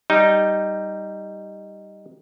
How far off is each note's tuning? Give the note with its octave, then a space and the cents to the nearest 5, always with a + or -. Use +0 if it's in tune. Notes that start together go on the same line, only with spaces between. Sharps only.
G3 +0 D#4 +0